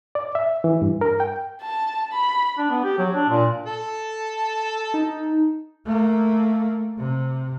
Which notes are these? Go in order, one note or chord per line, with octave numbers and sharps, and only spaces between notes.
D5
E5
E3
G2
A#4
G5
A5
B5
D4
B3
G4
F#3
D4
A#2
A4 A5
D#4
A3 A#3
C3